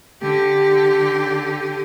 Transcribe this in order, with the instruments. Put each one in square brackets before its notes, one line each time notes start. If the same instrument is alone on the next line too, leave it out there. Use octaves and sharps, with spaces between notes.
[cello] D3 G4